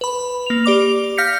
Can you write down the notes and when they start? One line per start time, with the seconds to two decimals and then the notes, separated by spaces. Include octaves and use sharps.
0.01 B4 B5
0.46 A#3 F7
0.64 G4 D5 D6 F7
1.17 F5 F6 G6 A#6 B6 C#7